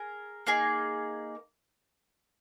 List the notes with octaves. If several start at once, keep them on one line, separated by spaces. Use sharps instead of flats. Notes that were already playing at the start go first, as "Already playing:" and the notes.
Already playing: G#4 A#4
A#3 D#4 G#4